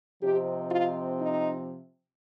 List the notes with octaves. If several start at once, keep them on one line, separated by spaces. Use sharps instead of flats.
C3 F3 C4 D#4 G4
F4
D#4